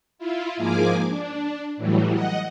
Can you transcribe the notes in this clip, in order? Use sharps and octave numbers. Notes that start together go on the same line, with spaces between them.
E4 F4
G#2 F3 A#3 G#4 G#5 D6
D4
A2 E3 F#3 G3
D#5 F#5